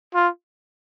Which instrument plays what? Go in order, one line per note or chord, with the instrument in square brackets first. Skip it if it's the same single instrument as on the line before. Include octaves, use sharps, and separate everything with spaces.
[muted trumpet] F4